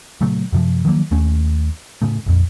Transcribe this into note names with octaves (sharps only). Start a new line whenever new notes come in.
A#2 C#3 F#3 A3
F#2 C3 F3
D#3 F3 F#3 A#3
D#2 A3 C#4
A2 C#3 A3
A#1 F2